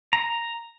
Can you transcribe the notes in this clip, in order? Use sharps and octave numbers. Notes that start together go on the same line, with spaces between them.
A#5